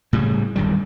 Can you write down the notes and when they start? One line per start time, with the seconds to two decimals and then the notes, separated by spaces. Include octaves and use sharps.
0.13 A2 C#3 G3
0.56 D1 G2 D#3 G3